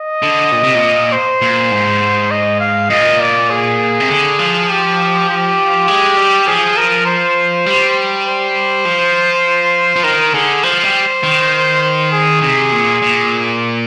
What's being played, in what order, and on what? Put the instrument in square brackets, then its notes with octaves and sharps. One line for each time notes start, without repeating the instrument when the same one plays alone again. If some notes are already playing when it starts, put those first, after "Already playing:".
Already playing: [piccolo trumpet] D#5
[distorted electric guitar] D3
A#2
C3
A#2
[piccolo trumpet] C5
[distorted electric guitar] A#2
G#2
[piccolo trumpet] D#5
F5
[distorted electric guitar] A#2 [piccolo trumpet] D#5
[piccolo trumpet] D5
G#4
[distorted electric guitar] C3
D3
F3
[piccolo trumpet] G4
G4
[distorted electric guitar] G#3
G3
[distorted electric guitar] F3 [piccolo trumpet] G#4
[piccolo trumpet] A#4
C5
[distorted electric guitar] G3
[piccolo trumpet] C5
[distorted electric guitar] F3
F3
[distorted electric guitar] D#3 [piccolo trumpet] A#4
[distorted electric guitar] D3 [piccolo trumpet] G#4
[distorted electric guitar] F3 [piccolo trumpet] C5
[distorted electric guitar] G3
D#3
[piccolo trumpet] C5
G#4
[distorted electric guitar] C3 [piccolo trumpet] G#4
[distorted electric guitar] A#2
A#2